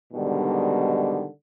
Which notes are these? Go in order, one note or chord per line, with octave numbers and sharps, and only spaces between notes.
G#2 B2 D3 D#3 G3